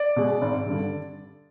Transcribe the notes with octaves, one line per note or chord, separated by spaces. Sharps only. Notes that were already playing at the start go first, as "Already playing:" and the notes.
Already playing: D5
B2 G#3
G#1
G2 D3